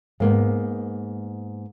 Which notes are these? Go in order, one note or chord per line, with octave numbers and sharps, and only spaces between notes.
G#2 A#3 B3